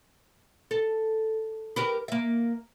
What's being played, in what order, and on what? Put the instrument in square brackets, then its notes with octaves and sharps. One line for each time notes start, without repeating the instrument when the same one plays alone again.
[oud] A4
G4 A#4 B4
A#3 E5